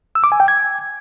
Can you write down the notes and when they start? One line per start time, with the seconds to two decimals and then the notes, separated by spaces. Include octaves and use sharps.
0.15 E6
0.24 D6
0.32 G#5
0.40 G5
0.48 G#6